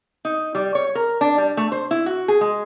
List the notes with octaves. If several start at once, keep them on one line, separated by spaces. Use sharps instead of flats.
D#4
G3
C#5
A#4
D4
G3
A3
C5
E4
F#4
G#4
G#3